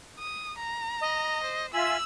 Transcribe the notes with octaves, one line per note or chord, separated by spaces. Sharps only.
D#6
A#5
D#5
C5
F4 E5 G#5 E6 F#7